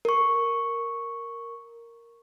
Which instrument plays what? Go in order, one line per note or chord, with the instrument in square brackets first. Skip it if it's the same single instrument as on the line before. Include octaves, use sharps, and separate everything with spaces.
[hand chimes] A#4 C#6